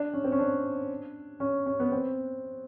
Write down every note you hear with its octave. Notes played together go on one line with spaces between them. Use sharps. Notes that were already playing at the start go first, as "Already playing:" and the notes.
Already playing: D4
C#4
C4
C#4
D4
C#4
C#4
B3
C4